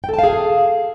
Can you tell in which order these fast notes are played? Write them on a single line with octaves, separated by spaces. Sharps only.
G5 A4 A5 F5 G#4